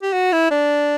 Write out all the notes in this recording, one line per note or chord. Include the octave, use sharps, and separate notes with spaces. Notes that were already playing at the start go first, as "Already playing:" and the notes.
G4
F#4
E4
D4